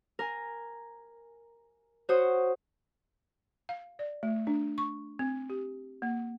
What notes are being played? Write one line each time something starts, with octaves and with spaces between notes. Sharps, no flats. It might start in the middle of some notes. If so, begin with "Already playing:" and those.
A#4 G#5
F#4 C5 C#5 D#6
F5
D5
A3
D4
C#6
C4
G4
A#3